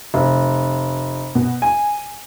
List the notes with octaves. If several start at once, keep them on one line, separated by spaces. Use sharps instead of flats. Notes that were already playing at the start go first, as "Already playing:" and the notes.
F1
B2
G#5